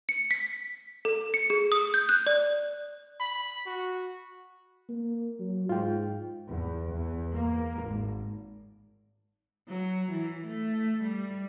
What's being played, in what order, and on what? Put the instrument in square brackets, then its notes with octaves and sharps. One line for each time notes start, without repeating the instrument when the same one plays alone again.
[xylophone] C#7
B6
A4
C#7
G#4
D#6
G6
F#6
D5
[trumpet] B5
F#4
[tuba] A#3
F#3
[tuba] G#2 [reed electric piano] F4 G5
[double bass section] E2
E2
A#3
G#1
[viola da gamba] F#3
E3
A3
G3